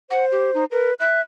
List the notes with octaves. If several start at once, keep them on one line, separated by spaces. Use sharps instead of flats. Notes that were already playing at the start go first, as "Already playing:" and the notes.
C5 F#5
G4
D#4
A#4 B4
E5 F#6